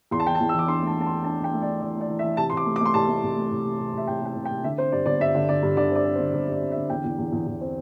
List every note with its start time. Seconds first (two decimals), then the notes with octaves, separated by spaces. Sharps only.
0.11 E2 C6
0.20 A5
0.26 E3 G5
0.35 A5
0.40 E2
0.49 E6
0.54 E3 D6
0.68 D4 C6
0.82 A3
0.87 A5
0.97 A3 A5
1.06 C6
1.10 D4
1.24 D4 A5
1.39 E3 G5
1.53 A3
1.62 D5
1.67 D4
1.81 E3 D5
1.95 A3
2.01 D5
2.09 E3
2.19 E5
2.23 E3
2.37 C3 A5
2.50 C6
2.52 C3 D6
2.65 A3
2.76 D6
2.81 A3 C6
2.94 C2 A5
3.08 A3
3.23 C2
3.36 A3
3.51 C2
3.65 C3
3.79 C2
3.93 C2 E5
4.08 C2 G5
4.22 C3 G5
4.35 C2
4.45 G5
4.50 C3
4.64 D3 E5
4.77 C4 C5
4.92 G2 D5
5.06 G1 D5
5.20 G2 E5
5.35 D3
5.49 D3 D5
5.63 G2
5.77 D3 D5
5.91 C4
5.96 D5
6.05 C4
6.15 C5
6.19 D3
6.33 G1 C5
6.48 G2 D5
6.61 C4
6.72 E5
6.76 D3
6.90 E2 G5
7.05 E2
7.19 E2
7.33 E2
7.47 E2
7.61 C4